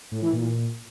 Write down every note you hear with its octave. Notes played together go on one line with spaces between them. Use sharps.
A2
E3
A#2